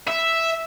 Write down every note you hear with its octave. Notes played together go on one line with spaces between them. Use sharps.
E5